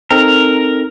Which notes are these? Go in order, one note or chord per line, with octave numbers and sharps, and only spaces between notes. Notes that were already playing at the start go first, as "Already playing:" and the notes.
C4 D#4 A4 A#4